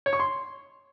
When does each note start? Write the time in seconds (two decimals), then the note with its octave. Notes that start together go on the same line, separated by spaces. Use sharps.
0.06 C#5
0.13 C#6
0.20 C6